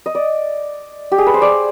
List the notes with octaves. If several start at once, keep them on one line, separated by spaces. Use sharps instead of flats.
D#5
D5
G4
G#4
B4
C5
D5